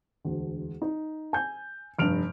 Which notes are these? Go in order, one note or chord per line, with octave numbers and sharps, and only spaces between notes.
E1 D2
D#4
G#5 G6
F1 G2 F6 D7 F7